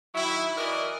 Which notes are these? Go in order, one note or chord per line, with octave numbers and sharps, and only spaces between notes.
D#3 F#3 E4
E3 F#4 A#4 D5 D#5